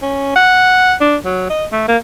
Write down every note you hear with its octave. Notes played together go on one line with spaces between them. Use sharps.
C#4
F#5
D4
F#3
D#5
A3
A#3